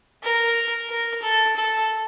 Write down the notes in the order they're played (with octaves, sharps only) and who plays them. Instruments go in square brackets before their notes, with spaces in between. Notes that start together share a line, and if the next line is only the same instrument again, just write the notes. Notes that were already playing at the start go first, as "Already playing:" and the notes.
[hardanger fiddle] A#4
A#4
A4
A4